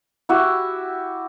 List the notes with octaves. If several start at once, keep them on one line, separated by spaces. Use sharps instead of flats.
E4 F#4 G4 E6